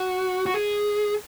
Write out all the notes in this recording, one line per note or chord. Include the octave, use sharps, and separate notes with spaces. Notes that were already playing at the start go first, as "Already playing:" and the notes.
Already playing: F#4
F#4
G#4